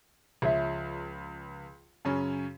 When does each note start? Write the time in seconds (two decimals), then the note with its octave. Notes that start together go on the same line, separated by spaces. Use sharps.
0.42 C#2 F3 G#4 C#5 E5
2.05 F#2 C#3 C#4